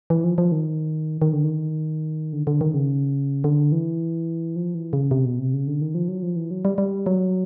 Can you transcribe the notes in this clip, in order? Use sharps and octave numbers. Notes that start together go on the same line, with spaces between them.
E3
F3
F3
D#3
D#3
D3
D#3
D3
D3
D#3
C#3
D3
E3
F3
E3
C#3
C3
B2
C3
C#3
D3
D#3
F3
F#3
F3
E3
F#3
G3
G3
F#3